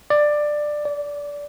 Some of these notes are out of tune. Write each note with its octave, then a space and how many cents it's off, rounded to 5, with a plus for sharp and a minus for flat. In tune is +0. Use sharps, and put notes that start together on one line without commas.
D5 +15
D5 -20